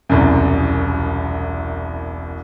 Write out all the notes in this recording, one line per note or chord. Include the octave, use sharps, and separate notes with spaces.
E1 C2 F#2